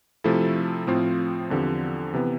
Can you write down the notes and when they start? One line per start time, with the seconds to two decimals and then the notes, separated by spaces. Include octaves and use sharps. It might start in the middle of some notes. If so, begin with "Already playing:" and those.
0.24 C3 F3 A3 E4 A4
0.87 A2 F3 C4 F4
1.50 E2 D3 F3 C4 G4
2.14 C3 E3 B3